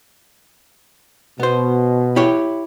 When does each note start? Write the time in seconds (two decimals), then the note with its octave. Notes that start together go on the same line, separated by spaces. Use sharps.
1.40 B2 B3 C5
2.16 E4 G4 C#5